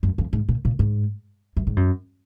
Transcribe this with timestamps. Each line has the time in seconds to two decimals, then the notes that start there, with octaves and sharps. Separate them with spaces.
0.03 F#2
0.18 F2
0.33 G#2
0.49 A#2
0.65 A#2
0.79 G#2
1.57 F#2
1.67 G#2
1.76 F#2